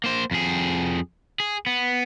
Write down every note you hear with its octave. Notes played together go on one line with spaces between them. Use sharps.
A#3 C5
F2 G#4
G#4
B3